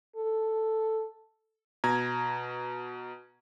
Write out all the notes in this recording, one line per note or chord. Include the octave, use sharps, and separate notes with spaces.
A4
B2 A#5 G#6